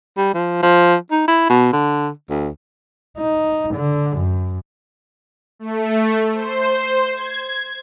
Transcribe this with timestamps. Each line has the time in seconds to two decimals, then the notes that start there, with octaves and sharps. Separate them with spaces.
0.17 G3
0.34 F3
0.62 F3
1.11 D#4
1.28 E4
1.50 B2
1.73 D3
2.30 D2
3.18 D#4
3.75 D3
4.17 F#2
5.59 A3
6.33 C5
7.14 G#6